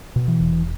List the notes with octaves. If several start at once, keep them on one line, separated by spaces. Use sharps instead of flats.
B2
E3
E1